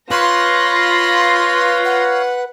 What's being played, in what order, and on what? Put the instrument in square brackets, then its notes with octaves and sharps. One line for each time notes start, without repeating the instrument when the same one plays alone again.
[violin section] F4 A#6 [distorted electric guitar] B4 [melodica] C#5 F5 [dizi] C6
[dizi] F#5